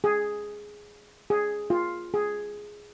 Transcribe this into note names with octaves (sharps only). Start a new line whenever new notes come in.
G#4
G#4
F4
G#4